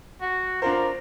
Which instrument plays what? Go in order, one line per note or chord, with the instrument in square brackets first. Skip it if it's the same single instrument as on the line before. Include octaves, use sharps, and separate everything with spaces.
[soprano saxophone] F#4
[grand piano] D4 F4 C5 [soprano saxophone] A#4